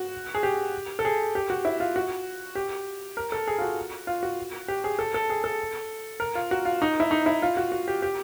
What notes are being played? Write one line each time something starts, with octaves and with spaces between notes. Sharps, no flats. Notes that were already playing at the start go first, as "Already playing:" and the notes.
Already playing: F#4
G#4
G4
A4
G#4
G4
F#4
E4
F4
F#4
G4
A#4
A4
G#4
F4
F#4
F4
F#4
G4
G#4
A4
A4
G#4
A4
A#4
F4
F#4
F4
D#4
E4
D#4
E4
F4
F#4
F#4
G4
G4